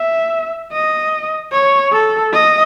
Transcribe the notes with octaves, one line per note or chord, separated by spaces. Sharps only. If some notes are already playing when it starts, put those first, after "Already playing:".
Already playing: E5
D#5
C#5
A4
D#5